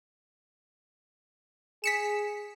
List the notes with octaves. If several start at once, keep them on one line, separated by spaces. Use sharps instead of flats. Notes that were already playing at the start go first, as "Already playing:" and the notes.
G#4 B6 C#7 E7